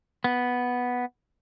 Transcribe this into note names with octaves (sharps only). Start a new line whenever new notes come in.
B3